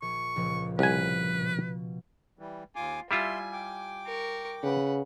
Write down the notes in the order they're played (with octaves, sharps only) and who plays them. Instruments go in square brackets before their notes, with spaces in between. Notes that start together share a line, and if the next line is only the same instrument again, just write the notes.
[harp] A#1 [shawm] C#6
[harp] C#2 A#2 F3
[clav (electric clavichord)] C2 G#5 [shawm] B4
[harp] B2
[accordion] E3 G3
[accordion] D#2 G#5 D6 [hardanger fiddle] F4
[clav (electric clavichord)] G3 E4 F4 [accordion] E5 C6 [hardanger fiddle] G#5
[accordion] G5 D6
[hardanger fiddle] A#4 C#6
[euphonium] C#3 [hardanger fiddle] B4 F#5